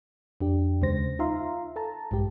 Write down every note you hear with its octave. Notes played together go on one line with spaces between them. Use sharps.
F2 D4 G4
D#2 C#3 G#3 C5 A#6
D#4 F4 E5 F5 A#5 C6
A4 A5 A#5
A#1 G2 G#3 G4